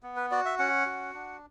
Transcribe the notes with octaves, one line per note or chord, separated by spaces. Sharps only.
B3
B4
F#4 D5
E5
C#4 F#5
F#4
D4